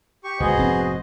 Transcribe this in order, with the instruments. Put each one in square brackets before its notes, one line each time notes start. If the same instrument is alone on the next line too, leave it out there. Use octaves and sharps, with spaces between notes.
[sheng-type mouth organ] G4 C#6
[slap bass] C#2 [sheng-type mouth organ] B3 G#4 [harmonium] F#4 C5 D#5
[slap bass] F1 G#2 C4